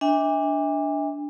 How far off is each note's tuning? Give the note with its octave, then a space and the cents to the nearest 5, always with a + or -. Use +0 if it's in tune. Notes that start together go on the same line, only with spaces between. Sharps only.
D4 -5 E5 -40 G#5 -45